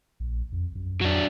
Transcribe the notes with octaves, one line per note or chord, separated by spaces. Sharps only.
A#1
F2
F#2
F2 F#3 D4